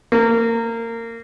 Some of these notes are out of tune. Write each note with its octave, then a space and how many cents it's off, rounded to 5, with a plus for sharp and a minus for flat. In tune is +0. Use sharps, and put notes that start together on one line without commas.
A#3 -25